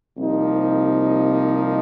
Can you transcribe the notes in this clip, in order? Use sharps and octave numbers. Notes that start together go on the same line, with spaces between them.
C2 C3 F3 A#3 D#4